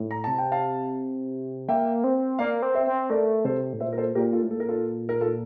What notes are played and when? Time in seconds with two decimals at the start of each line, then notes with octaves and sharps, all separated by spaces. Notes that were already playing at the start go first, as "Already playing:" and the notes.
Already playing: A2
0.11 A#5
0.24 C3 A5
0.38 G5
0.52 F5 A5
1.69 A#3 E5 G5
2.04 C4
2.39 A#3 D5 F5
2.62 C4
2.75 C5 E5
2.87 C4
3.10 A3 A#4 D5
3.45 C3 A4 C5
3.73 A2
3.80 A#2 C5 E5
3.92 A#4
3.97 A4 C5
4.15 A#2 G4 A#4
4.33 F4 A4
4.43 A2
4.50 A#2 A4
4.60 A#4
4.68 F4 A4
5.09 A#4
5.21 F4 A4